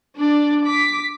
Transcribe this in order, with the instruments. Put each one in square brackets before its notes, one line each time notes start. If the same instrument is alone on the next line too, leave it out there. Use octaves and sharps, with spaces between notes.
[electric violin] D4 D5
D6 B6